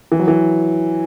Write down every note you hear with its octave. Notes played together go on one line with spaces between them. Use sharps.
E3
F#3
E3